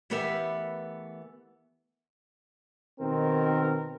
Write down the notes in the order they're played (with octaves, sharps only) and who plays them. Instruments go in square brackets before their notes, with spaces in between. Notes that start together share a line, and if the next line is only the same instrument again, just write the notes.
[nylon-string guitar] E3 A3 B3 G4 A#4 E5
[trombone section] B2 D#3 C4 A#4